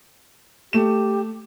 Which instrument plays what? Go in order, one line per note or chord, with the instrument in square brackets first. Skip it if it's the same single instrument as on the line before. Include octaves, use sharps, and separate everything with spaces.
[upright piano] A3 E7 [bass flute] G4